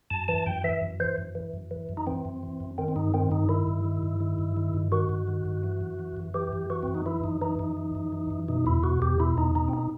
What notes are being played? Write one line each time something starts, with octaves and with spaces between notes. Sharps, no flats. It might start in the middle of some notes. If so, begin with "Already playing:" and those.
F#2 A5
E3 A5
F#2 G5
E3 E5
F#2
E3 C5
F#2
E3
F#2
E3
F#2
D#4
E3 C4
F#2
E3
F#2
D#3 C4
C4
G2 D#4
D#3 C4
G2 D#4
D#3 E4
G2
D#3
G2
D#3
G2
D#3
G2
D#3 F#4
G2
D#3
G2
E3
F#2
E3
F#2
E3 G4
F#2
E3 F#4
F#2 C4
D#4
E3 E4
F#2 D#4
E3 D#4
F#2 D#4
E3
F#2
E3
F#2
B2 D#4
E2 E4
B2 F#4
E2 G4
B2 E4
E2 D#4
B2 D#4
C4
D#4